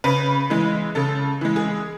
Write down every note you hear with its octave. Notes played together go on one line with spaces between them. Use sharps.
C#3 B4
E3 G#3
C#3 A4
E3 G#3
G#4